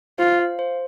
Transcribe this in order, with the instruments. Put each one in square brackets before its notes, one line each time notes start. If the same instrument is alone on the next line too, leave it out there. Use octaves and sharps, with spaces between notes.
[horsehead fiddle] F4 [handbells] C5
[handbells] F5
C5